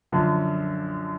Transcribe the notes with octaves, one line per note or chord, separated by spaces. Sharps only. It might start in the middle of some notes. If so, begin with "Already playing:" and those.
F#2 D3 F3